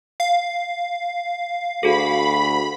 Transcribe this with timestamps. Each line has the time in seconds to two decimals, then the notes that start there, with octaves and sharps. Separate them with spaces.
0.20 F5
1.83 D2 F#4 G#4 A4 B5